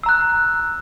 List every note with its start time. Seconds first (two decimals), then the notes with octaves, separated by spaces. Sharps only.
0.03 E6
0.06 A#5
0.09 F#6